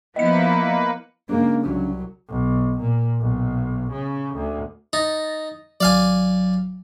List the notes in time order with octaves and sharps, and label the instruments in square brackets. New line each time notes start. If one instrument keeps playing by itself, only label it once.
[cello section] F3 B3 E4 [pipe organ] A#3 B4 [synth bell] D#5 C#7
[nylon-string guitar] C#3 G#3 D4 [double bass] A#3
[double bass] C2 F#3
B1
A#2
B1
C#3
D2
[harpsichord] D#4 [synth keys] A6 A#6
[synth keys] G#1 F#3 [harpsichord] D5 F5 G#5